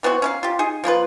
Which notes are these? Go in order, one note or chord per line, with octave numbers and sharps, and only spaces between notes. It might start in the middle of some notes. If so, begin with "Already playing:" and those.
E3 B3 C4 F#4
C#4 C#5 F5
F4 G4
D#4 G#4
F3 A#3 F4 B4